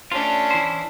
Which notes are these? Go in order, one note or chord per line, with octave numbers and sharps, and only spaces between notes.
A3 C#4 D4 F4
E3 E4 C5